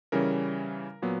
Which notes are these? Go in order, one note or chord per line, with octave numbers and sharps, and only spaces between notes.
C#3 E3 G3 C#4 A#4
A#2 F#3 B3